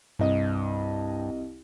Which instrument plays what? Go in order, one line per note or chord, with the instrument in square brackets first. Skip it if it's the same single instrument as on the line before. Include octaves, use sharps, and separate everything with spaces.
[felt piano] C2 D#5 [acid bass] G2